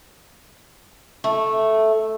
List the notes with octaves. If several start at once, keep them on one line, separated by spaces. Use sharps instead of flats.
A3